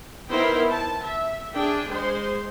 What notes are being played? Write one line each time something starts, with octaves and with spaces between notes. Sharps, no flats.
B3 D#4 E4 A#4 C5 G5
A5
E5
D4 G#4 G5
G#3 C5 C6